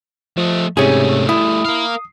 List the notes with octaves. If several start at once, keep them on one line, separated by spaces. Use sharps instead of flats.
F3 A3 D#5
G#2 C3 G3 A3 C#4 G#4
E4 D#6
A#4 F5